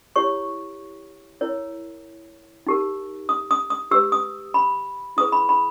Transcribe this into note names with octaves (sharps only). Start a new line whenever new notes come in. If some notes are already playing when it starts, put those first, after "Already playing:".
E4 G4 C#5 C#6
E4 A#4 C#5
D#4 G4 A#4
D#6
D#6
D#6
G4 B4 E6
D#6
B5
E4 G#4 B4 D#6
B5
B5